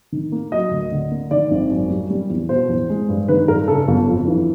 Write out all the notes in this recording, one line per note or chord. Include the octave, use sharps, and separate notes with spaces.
D#3
A#3
F#3 D#5
D2
D3
A#3
D#3 D5
G#1
F#2
G3
G3
E2
B2 C5
E2
G#3
G2
D#3 B4
G2 A#4
C#3 A4
G1
F2
E3